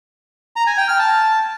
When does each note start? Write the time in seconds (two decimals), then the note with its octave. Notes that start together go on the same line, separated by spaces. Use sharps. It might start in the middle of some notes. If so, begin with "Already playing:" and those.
0.56 A#5
0.67 G#5
0.78 G5
0.88 F6
0.99 A5